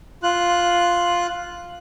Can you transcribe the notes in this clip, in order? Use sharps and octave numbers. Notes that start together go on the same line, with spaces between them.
F4 F#6